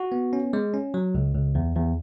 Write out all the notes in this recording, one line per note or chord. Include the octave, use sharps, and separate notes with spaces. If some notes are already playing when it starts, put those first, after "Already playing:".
Already playing: F#4
B3
C#4
G#3
C#4
F#3
C#2
C#2
E2
E2